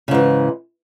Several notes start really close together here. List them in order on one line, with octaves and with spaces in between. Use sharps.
C#3 G#2 E3